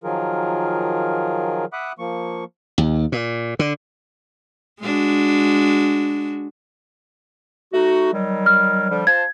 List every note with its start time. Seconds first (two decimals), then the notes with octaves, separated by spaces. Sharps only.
0.04 D#3 F3 F#3 F4 G#4 A#4
1.73 E5 F#5 B5 D6 D#6 F#6
1.99 F3 A#3 C#6
2.78 D#2
3.12 A#2
3.59 D3
4.81 G#3 D4 F#4
7.73 A3 D#4 F#4
8.13 D#3 F#3 G3
8.46 F6
8.90 D3 F3 G3
9.07 F4 C5 A5 G#6